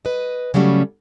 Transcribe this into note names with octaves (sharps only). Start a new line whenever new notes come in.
B4 D#5
C#3 F#3 G3 A3 C#4